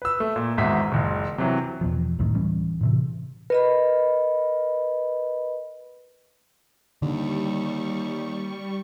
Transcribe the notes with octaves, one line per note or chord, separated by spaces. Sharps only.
B4 E6
A3
A#2
G#1 E2 G#2 E5 B6
F#1 C#2
C3 E3 F#3
E2 B2 F3
C#2 F#2 A2 D#3
D1 E3 G3 C#4
A2 C3 E3
A#4 B4 D#5 B5
D#2 D3 G3 D4 C#6